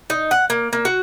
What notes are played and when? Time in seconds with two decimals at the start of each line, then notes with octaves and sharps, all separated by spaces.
0.10 D#4
0.31 F#5
0.50 A#3
0.73 A#3
0.85 F#4